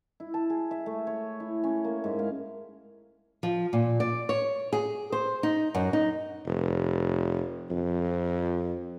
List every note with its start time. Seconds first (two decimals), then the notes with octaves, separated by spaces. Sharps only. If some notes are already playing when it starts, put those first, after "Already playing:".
0.20 E4
0.34 A5
0.50 G#4
0.71 E5
0.86 A3
1.07 C#5
1.40 E4
1.64 C#4
1.84 A#3
2.04 G#2
2.19 F5
3.43 F3
3.73 A#2
4.00 D5
4.29 C#5
4.73 G#4
5.12 C5
5.43 D#4
5.74 F#2
5.93 D#4
6.46 F1
7.70 F2